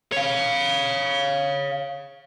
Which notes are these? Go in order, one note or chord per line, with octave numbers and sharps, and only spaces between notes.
C#5 F5